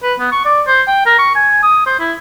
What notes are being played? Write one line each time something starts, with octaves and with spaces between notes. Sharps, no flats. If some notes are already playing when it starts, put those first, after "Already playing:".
B4
B3
C#6
D5
C5
G5
A#4
C#6
G#5
D#6
C5
E4